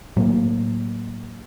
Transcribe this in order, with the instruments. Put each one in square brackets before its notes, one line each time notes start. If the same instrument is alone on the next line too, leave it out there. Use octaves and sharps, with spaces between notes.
[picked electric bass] A2 F#3 A#3